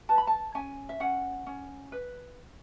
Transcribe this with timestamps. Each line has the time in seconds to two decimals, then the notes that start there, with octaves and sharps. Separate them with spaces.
0.09 B4 A5
0.18 B5
0.27 A5
0.55 C#4 G#5
0.89 E5
1.00 C#4 F#5
1.46 C#4
1.92 B4